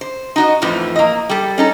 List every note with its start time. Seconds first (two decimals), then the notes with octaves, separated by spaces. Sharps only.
0.01 C5
0.36 D#4 F#4 D#5
0.62 F2 A2 E3 F3
0.96 A#3 D#5
1.29 G3 A4
1.58 C#4 D#4 A4